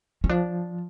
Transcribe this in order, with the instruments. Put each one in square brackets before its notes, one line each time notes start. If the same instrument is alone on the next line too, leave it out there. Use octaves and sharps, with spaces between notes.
[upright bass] C#4
[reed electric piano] F3 [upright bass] D4